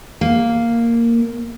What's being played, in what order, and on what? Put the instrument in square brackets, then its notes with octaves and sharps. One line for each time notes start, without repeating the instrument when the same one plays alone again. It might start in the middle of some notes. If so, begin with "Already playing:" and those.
[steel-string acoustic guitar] A#3